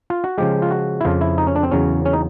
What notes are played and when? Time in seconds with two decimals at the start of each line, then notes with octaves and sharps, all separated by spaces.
0.10 F4
0.24 F#4
0.38 C#3 F3 G#3 G4
0.62 F4
0.71 F#4
1.01 E4
1.05 F2 C#3 F3 F4
1.21 E4
1.38 D#4
1.47 C#4
1.56 D4
1.63 C4
1.71 E2 C#3 F#3 C#4
2.05 C#4
2.13 D#4